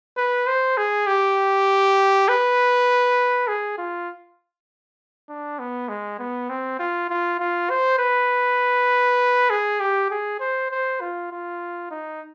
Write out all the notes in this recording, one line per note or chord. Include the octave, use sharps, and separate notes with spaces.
B4
C5
G#4
G4
B4
G#4
F4
D4
B3
G#3
B3
C4
F4
F4
F4
C5
B4
G#4
G4
G#4
C5
C5
F4
F4
D#4